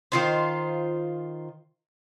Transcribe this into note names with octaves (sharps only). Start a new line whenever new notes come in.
D#3 F4 C5